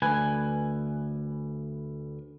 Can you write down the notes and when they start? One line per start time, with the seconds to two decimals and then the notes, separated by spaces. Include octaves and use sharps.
0.02 D2 B4 G#5